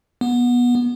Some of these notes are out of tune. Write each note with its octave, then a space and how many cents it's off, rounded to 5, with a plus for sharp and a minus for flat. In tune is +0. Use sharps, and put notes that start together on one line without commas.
B3 -20